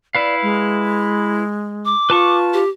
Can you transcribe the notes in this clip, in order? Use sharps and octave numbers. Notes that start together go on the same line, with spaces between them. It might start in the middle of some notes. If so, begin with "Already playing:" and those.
E4 B4 D5 F5
G#3
D6
F4 B4 A5 C#6
G4